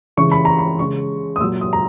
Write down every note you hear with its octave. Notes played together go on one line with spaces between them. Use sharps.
C#3 E3 G#3 C#6
B5
A#5
B5
C#3 G#3 C#6
D#6
A#2 F#3 E6
D#6
A#5